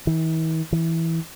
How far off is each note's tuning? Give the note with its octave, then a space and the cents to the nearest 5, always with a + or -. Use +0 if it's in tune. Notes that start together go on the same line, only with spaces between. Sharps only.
E3 -45
E3 -10